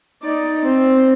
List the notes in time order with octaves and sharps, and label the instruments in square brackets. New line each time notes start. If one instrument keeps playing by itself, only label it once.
[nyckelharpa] D#4 D5
C4